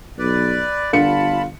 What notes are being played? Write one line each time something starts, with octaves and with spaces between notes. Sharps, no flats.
B1 B4 D5
G1 D3 F4 A5 B5 C#7